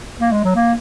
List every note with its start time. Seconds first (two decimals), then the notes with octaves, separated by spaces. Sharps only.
0.20 A#3
0.32 G#3
0.44 F#3
0.55 A#3